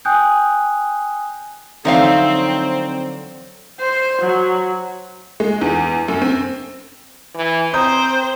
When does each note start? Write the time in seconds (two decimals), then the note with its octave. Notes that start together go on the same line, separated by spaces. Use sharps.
0.05 G5 G#5 D#6 F#6 G6
1.85 D3 F3 F#3 C4 D#4 E5 F5
3.80 C5
4.22 F#3
5.40 G#3
5.61 E2
6.08 F#2
6.22 C4
7.35 E3
7.74 C4 C5 A#5 D#6 G6